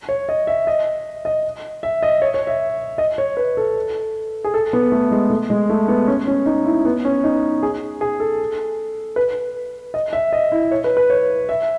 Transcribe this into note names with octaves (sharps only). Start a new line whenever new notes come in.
C#5
D#5
E5
D#5
D#5
E5
D#5
C#5
C#5
E5
D#5
C#5
B4
A4
G#4
A4
B3
A3
G#3
A3
G#3
A3
B3
C#4
C#4
D#4
E4
B3
C#4
D#4
G#4
G#4
A4
B4
D#5
E5
D#5
E4
C#5
B4
B4
C#5
E5